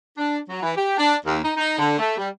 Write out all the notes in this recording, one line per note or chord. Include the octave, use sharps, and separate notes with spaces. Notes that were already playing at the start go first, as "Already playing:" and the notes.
D4
F#3
E3
G4
D4
D#2
D#4
D#4
D3
A3
G3